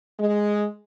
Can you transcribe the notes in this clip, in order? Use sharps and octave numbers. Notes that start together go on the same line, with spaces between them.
G#3